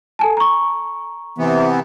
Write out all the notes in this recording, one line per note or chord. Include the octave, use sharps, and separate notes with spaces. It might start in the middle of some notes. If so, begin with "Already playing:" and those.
A4 G#5 A5
A#5 C#6
C3 E3 B3